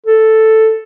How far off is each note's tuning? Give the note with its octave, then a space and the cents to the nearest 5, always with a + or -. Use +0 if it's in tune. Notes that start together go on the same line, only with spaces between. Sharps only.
A4 +0